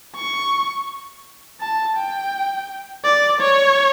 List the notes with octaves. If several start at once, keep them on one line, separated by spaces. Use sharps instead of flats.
C#6
A5
G5
D5
C#5